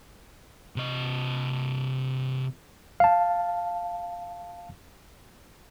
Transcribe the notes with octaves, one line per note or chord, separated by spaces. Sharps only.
C3 D#5
F5 A5